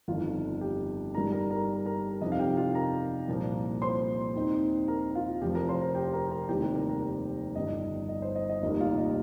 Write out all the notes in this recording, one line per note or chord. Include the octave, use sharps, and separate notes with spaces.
G1 F2 D#3 F4 F5
G4 G5
G2 G3 D#4 A#4 A#5
A#4 A#5
A#4 A#5
A#4 A#5
F2 C3 F3 D#4 D#5
F5
G4 G5
F4 F5
A#4 A#5
C2 A#2 F3 A#3
C5 C6
D#2 D#3 C4 D#4
A#4 A#5
F4 F5
F1 F2 F3 G4 G5
A#4 A#5
C5 C6
A#4 A#5
G4 G5
A#4 A#5
A#4 A#5
F1 D#2 D#3 G3 C4 G4 G5
G4 G5
A#4 A#5
A#4 A#5
G1 G2 D#3 D#5
D#5
C5
D#5
D#5
F1 D#2 D#3 G3 A#3 D#5
F4 F5
D#5